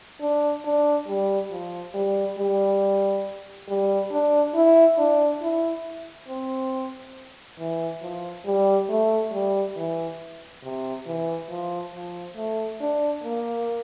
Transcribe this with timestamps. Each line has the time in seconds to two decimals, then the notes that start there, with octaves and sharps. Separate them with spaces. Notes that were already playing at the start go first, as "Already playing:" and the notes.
0.20 D4
0.64 D4
1.08 G3
1.50 F3
1.94 G3
2.38 G3
3.69 G3
4.11 D4
4.55 E4
4.98 D4
5.42 E4
6.28 C4
7.59 E3
8.02 F3
8.46 G3
8.89 A3
9.32 G3
9.77 E3
10.63 C3
11.06 E3
11.50 F3
11.94 F3
12.36 A3
12.80 D4
13.23 A#3